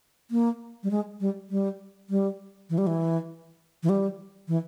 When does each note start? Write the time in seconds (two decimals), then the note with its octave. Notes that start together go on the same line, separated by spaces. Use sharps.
0.31 A#3
0.83 G3
0.91 G#3
1.20 G3
1.50 G3
2.10 G3
2.70 E3
2.78 G3
2.87 E3
3.83 E3
3.89 G3
4.48 E3